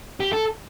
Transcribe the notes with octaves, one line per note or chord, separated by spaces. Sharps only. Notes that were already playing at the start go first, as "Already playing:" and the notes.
G4
A4